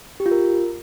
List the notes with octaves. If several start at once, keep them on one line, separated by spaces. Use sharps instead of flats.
G4
F4
A#4